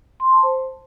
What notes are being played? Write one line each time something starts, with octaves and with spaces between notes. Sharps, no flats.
C6
A5
C5